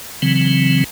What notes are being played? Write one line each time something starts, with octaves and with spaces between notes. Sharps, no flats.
C#3 E3 F#3 C4